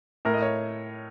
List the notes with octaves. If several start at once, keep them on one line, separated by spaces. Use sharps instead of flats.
A2 A#4
D#5
C#5